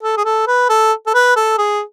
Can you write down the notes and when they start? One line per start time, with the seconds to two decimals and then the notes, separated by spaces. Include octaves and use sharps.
0.03 A4
0.17 G#4
0.25 A4
0.47 B4
0.69 A4
1.06 A4
1.14 B4
1.36 A4
1.58 G#4